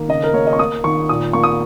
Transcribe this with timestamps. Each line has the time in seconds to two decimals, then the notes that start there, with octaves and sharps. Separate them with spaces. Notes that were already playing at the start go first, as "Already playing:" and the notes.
Already playing: D#3 A#3
0.08 C#3 D#5
0.24 A#4
0.34 A#3 C#5
0.47 D#5
0.53 C#6
0.59 A#3 D#6
0.84 D#3 C#6
1.09 A#2 D#6
1.33 A#3 C#6
1.44 D#6